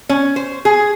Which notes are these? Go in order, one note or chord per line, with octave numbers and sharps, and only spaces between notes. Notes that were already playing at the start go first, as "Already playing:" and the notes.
C#4
C5
G#4